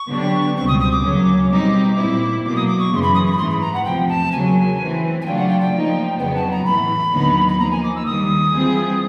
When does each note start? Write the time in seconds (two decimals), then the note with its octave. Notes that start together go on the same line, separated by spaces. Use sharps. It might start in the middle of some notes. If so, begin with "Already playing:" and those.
Already playing: C#6
0.09 D3 F#3 B3 D4 G4
0.56 C#2 B2 G3 C4 C#6
0.68 D#6
0.80 D#6
0.92 D6
1.03 D2 C#3 F#3 A#3 C#4
1.51 B2 G3 C4 D#4 D6
1.97 A#2 G3 C4 E4
2.44 B2 F#3 A#3 D6
2.56 D#6
2.67 D6
2.79 C#6
2.91 F#2 C#3 E3 C6
3.02 B5
3.15 D#6
3.26 C#6
3.32 B5
3.38 G#2 E3 A3 C6
3.50 B5
3.61 A#5
3.74 F#5
3.84 E2 C3 F3 G5
4.08 A5
4.32 C#3 F#3 A#3 G#5
4.79 E3 A3 C4
5.21 G#5
5.25 C#3 F#3 A3 D4 F4 G5
5.36 F#5
5.48 G5
5.61 G5
5.72 F3 A#3 D#4
6.18 F2 C#3 F#3 B3 G5
6.35 A5
6.51 A#5
6.65 A2 E3 A3 B5
7.13 D#2 D3 F#3 B3 D#4
7.48 B5
7.59 F3 A#3 D#4 A#5
7.71 G#5
7.83 D6
7.95 E6
8.06 D#2 D#3 G3 D#6
8.53 E3 G3 C4 F4 G#4